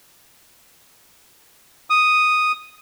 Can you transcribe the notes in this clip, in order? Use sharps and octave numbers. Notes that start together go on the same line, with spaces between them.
D#6